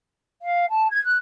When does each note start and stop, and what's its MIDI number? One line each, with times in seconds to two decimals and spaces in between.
0.42 0.68 77
0.69 0.88 81
0.91 1.02 92
1.04 1.17 90